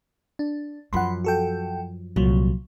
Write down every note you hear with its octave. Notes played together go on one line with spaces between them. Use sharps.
D4
F#2 F3 F#5 B5 C6
F#4 A4 G5
C2 A#2 F3 F#3